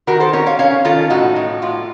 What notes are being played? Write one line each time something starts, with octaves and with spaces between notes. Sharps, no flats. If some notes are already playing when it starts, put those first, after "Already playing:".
D#3 F#4 A#4
A4 C5
C#4 A#4 C#5
C#5 F5
C#4 C#5 F5
D#3 F4 A4
A2 D#4 F#4
A2
A2 F4